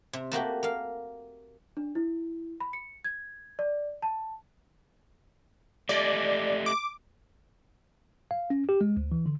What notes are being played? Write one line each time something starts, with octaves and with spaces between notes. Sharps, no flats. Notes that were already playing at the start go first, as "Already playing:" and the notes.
C3
A3 A#3 F#4 G4
A#3 F5
D4
E4
B5
C#7
G#6
D5
A5
A3 G4 D5 D#5
D6
F5
C#4
G4
G#3
D2
E3
D3